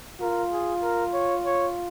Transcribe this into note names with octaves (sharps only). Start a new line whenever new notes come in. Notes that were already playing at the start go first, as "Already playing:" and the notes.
F4 A#4
G#4
A#4
C#5
C#5